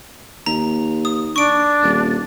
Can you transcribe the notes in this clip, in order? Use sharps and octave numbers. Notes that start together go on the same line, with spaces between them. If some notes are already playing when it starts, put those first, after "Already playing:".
D#2 A#5
D#6
D4 C#6 D7
D#1